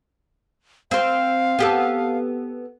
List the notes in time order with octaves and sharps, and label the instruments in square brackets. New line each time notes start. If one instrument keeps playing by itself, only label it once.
[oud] C4 C5 [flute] F5
[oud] B3 G4 A4